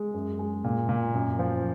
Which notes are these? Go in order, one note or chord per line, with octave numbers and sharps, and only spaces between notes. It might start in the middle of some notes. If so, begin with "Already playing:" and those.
Already playing: G#3
F#2
G#3
A#2
A#2
F#2
F3